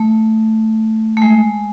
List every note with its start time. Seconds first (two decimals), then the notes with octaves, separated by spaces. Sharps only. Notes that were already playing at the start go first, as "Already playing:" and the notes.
Already playing: A3
1.17 A3
1.22 G#3